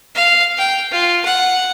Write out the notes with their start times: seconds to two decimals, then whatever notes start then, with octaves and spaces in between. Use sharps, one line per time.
0.15 F5
0.58 G5
0.92 F4
1.25 F#5